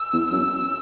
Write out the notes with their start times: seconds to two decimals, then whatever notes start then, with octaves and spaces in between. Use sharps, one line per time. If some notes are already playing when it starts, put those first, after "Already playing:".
Already playing: E6
0.13 E2
0.31 F#2 E6